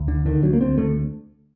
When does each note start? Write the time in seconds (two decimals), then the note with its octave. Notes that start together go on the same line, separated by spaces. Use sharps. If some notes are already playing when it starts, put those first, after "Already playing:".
Already playing: D2
0.08 D3
0.26 D3 D#3
0.43 D2 F#3
0.53 A#3
0.61 D2 C4
0.78 D3 A3